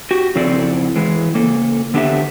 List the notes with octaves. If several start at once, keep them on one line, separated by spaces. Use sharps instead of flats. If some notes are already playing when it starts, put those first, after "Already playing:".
F#4 G4
F2 C#3 C4 E4 A4 D5
E3 G#3
C#3 A#3 A4
D3 B3 D4 G4 A4 E5